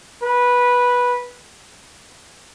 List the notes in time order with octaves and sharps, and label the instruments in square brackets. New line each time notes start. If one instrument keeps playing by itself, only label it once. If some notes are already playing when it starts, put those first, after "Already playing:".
[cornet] B4